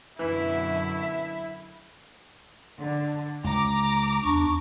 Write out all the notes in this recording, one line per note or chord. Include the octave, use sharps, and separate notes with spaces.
F#2 B2 D3 E3 E4 E5
D3
C#2 A#5 D6
E2 D4 C#6